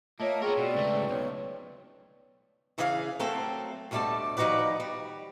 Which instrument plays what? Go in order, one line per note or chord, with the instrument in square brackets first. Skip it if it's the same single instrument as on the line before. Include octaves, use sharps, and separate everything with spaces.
[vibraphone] A3 C#5 [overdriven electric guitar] A#3 [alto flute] F4 [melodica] D#5 E5 A5
[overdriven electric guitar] B3 A#4 [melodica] C4 C#6 [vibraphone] G#4
[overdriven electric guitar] B2 [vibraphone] F#4 [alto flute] D5
[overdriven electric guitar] C#2 A3 [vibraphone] B4
[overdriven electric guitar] B1 [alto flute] C#5
[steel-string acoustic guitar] C#3 E3 C#4 G#4 D5 F5
F#3 A3 A#3 C4 A4
D2 B2 G3 A3 D5 A5
D#3 F3 D#4 F#4 B4 D5
G3